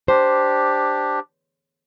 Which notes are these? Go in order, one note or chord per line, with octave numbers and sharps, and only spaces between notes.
D4 G4 C5